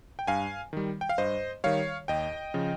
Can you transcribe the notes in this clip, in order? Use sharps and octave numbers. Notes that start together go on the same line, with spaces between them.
G5
G2 F5 G#5
D#3 G3
G5
F5
G2 C5 D#5
D#3 G3 C#5 F5
D#2 D#5 G5
C#3 F3